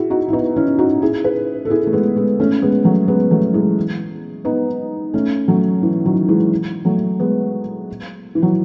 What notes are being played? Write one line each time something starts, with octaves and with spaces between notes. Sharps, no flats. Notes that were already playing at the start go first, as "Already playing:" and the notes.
Already playing: E4 F#4 G#4
D#4 F#4
E4
B3 D#4
C#4 E4
D#4 F#4
E4 G#4
G#4 B4
A4
E4 G#4
A3
G#3 B3
G#3 B3
A3 C#4
G#3 B3
F#3 A3
G#3 B3
F#3 A3
E3 G#3
B3 D#4
A3 C#4
F#3 A3
E3
D#3 F#3
E3 G#3
F#3 A3
G#3 B3
E3
F#3